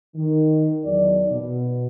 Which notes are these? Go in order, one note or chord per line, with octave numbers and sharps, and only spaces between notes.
D#3
E2 D#3 F#3 D#4 D5
B2